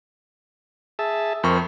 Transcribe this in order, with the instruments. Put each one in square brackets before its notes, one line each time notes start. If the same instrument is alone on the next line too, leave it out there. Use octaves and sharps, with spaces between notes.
[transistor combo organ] G#4 E5 A5
[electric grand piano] F2 C#6 [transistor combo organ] A#4 C5